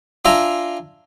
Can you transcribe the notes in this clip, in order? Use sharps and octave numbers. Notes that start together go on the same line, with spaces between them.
D4 F4 E5 G#5 A#5